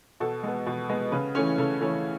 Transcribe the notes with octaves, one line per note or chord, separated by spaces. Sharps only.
B2 A4
G#3 B3
B2
G#3 B3
C#3 B4
E3 A3 C#4 C#5
C#3 A4
E3 A3 C#4